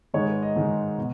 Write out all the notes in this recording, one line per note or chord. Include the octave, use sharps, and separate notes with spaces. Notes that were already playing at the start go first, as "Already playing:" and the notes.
G#2 D#3 G#3 C#5
B4
D#5
G#2 D#3 G#3
B2